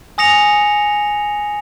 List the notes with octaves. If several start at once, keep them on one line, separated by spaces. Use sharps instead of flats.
G#5 D#6 A#6 C#7 F7